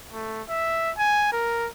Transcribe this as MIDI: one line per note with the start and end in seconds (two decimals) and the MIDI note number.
0.13 0.42 57
0.49 0.91 76
0.98 1.29 80
1.32 1.68 70